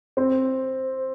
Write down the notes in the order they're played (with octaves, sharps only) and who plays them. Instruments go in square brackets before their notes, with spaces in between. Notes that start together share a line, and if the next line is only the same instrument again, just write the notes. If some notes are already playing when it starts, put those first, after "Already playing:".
[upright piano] C4